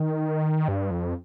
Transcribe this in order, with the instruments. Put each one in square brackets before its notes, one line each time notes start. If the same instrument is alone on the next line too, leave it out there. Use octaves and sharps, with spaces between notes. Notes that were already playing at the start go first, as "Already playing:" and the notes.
Already playing: [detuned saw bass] D#3
G2
F2